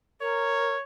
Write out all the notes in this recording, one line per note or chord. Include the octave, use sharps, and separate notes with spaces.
A#4 C#5